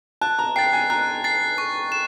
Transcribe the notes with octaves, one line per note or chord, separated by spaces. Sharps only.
A5 F#6
A#5
G5 A6 C7
G#5
A#5 F#6
A6 C7
C#6
E7